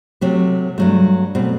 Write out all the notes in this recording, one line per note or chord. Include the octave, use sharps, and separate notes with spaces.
C3 F#3 A3
G2 F#3 A3
B2 A3 C4